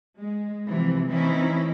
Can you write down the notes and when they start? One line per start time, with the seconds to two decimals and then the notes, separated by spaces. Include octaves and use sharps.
0.18 G#3
0.65 C3 E3 F3
1.10 E3 A3 C4 C#4 D#4 E4